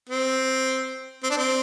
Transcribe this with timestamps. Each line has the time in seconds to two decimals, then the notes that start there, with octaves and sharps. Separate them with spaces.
0.09 C4
1.23 C4
1.30 D4
1.38 C4